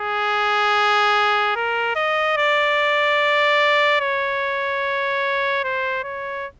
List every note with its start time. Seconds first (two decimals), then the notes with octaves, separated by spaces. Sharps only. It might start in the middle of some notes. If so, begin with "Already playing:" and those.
Already playing: G#4
1.56 A#4
1.96 D#5
2.37 D5
4.01 C#5
5.64 C5
6.04 C#5